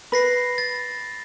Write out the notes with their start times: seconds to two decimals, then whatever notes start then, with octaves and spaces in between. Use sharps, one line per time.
0.12 B4 B5 A#6 C7
0.58 A6